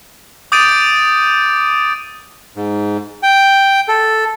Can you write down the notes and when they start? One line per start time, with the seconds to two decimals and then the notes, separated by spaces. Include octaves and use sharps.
0.52 D6 D#6 G6 A6 D7 D#7
2.56 G#2
3.23 G5
3.88 A4